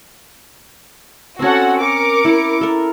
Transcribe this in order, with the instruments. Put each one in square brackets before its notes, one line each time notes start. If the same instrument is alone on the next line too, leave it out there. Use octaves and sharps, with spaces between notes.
[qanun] C4 C#4 [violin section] F#4 A4 F#5
[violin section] A#4 D6 C#7
[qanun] E4
A4 A#4